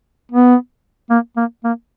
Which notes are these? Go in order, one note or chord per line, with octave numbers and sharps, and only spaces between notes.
B3
A#3
A#3
A#3